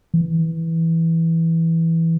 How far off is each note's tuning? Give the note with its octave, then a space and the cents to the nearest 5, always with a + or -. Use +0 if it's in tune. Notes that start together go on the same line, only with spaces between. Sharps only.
E3 -5